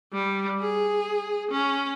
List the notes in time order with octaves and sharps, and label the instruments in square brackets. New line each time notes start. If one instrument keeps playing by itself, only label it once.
[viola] G3
G#4
C#4